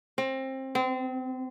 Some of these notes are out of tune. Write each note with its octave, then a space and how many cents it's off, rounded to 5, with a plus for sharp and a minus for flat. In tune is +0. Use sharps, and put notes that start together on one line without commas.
C4 +25
C4 -30